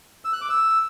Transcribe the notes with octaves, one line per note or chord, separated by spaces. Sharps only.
E6
F#6
D6
E6